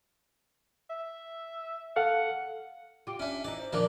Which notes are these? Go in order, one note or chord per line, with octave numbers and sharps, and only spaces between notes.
E5
A4 F5 F#5
F4 G4 G5
C#4 D4 E5
E3 D#4 D5 D#5
C5
A#2 D#3 F3 D4 D5